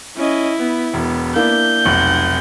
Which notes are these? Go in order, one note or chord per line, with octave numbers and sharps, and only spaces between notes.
C#4 E4 D#5
B3
E1 B3
A#3 D4 E4 G6
F1 B1 F#5 F#7